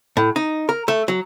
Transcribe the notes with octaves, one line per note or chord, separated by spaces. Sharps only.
A2
D#4
A#4
A3
F#3